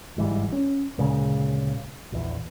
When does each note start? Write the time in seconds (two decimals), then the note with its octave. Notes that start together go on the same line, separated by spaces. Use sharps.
0.17 G1 G#2 E3 G3
0.52 C#4
0.98 D2 A#2 C#3 G#3
2.12 A#1 E2